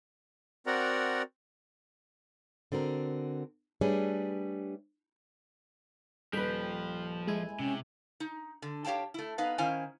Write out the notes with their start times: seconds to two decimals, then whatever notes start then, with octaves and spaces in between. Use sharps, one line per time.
0.66 C4 F#4 A#4 D5 F#5 A#5
2.72 D3 C4 F#4 A#4
3.81 G3 A3 D4 G#4 B4 C#5
6.33 D#1 F3 B4 G5 B5
7.27 G#3 E4 G#5
7.60 C3 C#4
8.20 D#4
8.62 D3
8.85 G4 C#5 F5 G5 A5
9.14 A3 E4
9.38 B3 D#4 B4 F5
9.58 D#3 C#4 E4 C5 F5 G#5